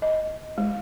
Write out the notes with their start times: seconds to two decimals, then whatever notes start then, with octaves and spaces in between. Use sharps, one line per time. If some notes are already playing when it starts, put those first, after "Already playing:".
0.02 D#5
0.58 G#3